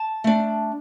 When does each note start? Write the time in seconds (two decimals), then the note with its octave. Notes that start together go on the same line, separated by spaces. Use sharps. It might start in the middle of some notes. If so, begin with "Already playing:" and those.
Already playing: A5
0.24 A3 D4